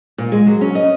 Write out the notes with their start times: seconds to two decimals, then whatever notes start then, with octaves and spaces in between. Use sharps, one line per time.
0.18 A#2
0.32 G#3
0.47 F#3
0.61 C#4
0.75 D#5